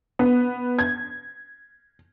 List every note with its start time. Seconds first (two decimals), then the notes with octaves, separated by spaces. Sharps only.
0.19 B3
0.79 G#6